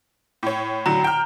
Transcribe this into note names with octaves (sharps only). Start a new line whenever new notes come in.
A2 C#5
A2 D3 F#3 A#5
G5 F6